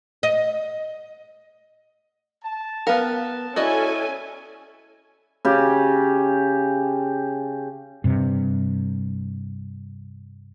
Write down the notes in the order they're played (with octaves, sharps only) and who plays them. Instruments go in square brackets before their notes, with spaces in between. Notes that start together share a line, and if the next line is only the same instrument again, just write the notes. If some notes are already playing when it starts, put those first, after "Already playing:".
[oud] D#5
[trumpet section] A5
[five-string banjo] B3 A#4 [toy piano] B4 F5 G5 [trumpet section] A5
[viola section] C#4 A4 G#5 [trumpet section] E4 [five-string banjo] F#4 D5 D#5
[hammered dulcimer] C#3 G4
[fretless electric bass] G2 C3